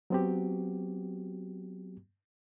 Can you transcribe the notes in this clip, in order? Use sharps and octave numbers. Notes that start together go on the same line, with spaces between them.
F#3 B3 C4 F#4 G4